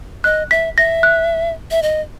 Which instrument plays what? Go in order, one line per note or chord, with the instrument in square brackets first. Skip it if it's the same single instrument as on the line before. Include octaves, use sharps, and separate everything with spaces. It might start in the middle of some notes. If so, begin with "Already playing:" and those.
[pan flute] D#5 [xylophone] F#6
[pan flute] E5 [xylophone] B6
[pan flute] E5 [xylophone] A#6
[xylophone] F#6
[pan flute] E5
D#5